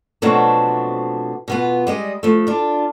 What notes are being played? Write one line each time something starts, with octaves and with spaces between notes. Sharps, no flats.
B2 F3 F#3 A3 C4 D4
B2 B3 F4
G3 G#3 D#5
F3 A3
D4 F4